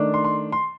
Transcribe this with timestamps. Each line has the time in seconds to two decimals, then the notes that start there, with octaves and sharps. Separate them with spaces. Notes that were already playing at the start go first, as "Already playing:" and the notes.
Already playing: D#3 A3 D4
0.14 C6
0.24 C6
0.52 C6